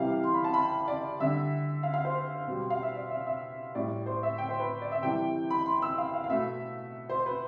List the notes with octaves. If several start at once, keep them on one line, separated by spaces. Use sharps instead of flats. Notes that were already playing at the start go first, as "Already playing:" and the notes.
Already playing: C3 E3 G3 F5
C6
B5
A5
B5
D5
D3 G3 E5
F5
F5
C5
B2 G3
F5
E5
D5
E5
E5
A2 G3 D5
C5
E5
G5
C5
B4
D5
E5
C3 E3 G3 G5
B5
C6
E6
F5
F5
F5
B2 A3 E5
C5
B4